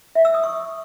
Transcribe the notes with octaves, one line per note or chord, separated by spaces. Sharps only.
E5
E6
D#6
C#6